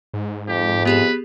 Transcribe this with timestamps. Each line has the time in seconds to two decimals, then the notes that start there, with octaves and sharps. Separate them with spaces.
0.14 G#2
0.48 F2 G4
0.85 B3 G4 G#4 B4